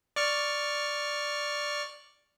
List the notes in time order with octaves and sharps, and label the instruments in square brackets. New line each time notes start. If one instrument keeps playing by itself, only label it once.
[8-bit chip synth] D5 C#6 F6